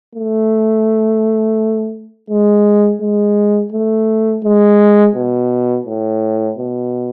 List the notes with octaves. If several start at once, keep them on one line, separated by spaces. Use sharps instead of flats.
A3
G#3
G#3
A3
G#3
B2
A2
B2